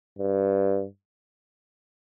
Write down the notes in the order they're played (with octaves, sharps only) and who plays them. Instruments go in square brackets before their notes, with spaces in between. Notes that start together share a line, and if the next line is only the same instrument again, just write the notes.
[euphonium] G2